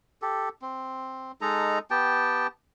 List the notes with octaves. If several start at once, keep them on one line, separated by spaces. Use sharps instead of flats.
G4 A4
C4
G#3 D#4 A4 A#5
B3 G4 G5 A5